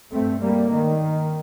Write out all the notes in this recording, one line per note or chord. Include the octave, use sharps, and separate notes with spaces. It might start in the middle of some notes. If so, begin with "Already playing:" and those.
G2 A3 C4
G3 A#3
D#3